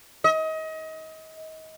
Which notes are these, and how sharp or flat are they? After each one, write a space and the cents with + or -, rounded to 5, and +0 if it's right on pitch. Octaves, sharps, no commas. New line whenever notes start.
D#5 +30